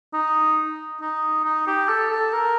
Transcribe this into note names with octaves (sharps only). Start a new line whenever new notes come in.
D#4
D#4
D#4
G4
A4
A4
A#4